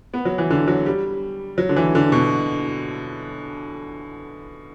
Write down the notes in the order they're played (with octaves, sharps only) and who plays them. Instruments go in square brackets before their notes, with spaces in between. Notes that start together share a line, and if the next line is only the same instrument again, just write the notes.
[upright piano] B3
F#3
E3
D3
F#3
G3
F#3
D3
E3
D3
B2